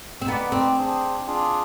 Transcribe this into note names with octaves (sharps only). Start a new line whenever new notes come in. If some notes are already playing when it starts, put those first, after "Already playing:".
C4
B3 D#4 B4 D5
C4
D4 G#4 C5
D4 F4 G#4